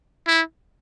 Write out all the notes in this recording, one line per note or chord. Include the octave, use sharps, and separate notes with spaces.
E4